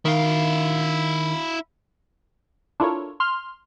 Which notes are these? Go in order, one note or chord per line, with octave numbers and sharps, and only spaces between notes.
D#3 E4 F5
D4 E4 F4 A4 A#4 C#5
C6 F6